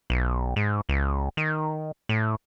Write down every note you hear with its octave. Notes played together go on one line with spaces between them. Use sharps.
B1
G#2
C#2
D#3
A2